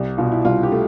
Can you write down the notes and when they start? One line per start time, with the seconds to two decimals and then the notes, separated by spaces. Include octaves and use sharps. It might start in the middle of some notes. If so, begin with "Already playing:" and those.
Already playing: C2
0.18 B2 F4
0.32 E4
0.45 C2 F4
0.63 G4
0.72 A3